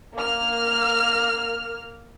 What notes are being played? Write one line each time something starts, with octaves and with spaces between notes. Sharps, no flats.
A#3 F6